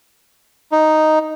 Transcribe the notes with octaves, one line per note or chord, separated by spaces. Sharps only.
D#4